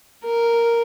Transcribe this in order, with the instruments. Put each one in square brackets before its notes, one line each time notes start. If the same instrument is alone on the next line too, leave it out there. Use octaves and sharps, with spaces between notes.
[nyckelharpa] A#4